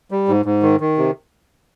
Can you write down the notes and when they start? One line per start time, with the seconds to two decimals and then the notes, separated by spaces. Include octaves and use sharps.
0.11 G3
0.28 G#2
0.45 G#2
0.63 D#3
0.80 D#3
0.97 C3